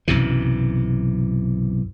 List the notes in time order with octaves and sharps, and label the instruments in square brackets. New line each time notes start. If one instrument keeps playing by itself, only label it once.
[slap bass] B1 F#2 C3 E3